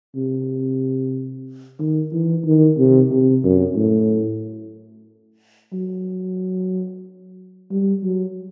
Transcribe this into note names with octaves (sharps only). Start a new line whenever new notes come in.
C3
D#3
E3
D#3
C3
C3
F#2
A2
F#3
G3
F#3